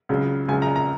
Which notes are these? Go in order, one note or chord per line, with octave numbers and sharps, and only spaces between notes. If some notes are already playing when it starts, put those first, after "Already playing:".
C#2 C#3 F#3
C#2 C#3 F#3 G#5
A#5
A#5